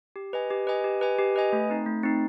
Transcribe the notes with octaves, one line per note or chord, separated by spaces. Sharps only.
G4
B4 D#5 G#5
G4
B4 D#5 G#5
G4
B4 D#5 G#5
G4
B4 D#5 G#5
A3
C4 D#4
A3
C4 D#4